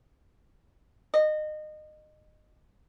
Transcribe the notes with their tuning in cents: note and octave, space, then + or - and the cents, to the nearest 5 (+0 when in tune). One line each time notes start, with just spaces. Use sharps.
D#5 -25